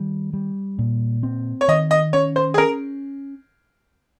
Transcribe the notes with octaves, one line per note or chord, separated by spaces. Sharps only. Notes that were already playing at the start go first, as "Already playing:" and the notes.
Already playing: D#3 G3
G3
A#2
C4
C#5
D#3 D#5
D#5
C#4 C#5
C5
G#4
C#4 A#4